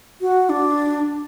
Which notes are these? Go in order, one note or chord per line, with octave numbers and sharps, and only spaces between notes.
F#4
D4